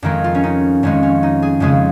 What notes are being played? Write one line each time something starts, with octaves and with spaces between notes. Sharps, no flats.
F2 D#3 G#3 A#4
F4
C#4
D#4
F2 D#3 G#3 C#4
C#4
D#4
G#4
F2 C#3 G#3 G#4